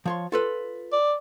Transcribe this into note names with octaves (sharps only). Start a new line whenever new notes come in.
F3 C#5 C6
F4 A4 B4
D5